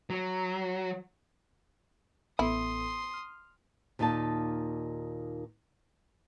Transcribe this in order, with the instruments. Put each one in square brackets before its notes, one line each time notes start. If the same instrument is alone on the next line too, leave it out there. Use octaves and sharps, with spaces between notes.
[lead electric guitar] F#3
[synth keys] A1 B3 A4 [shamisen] E4 [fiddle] C6 D#6
[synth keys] F6
[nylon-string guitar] D#2 A#2 D#4 F5 A5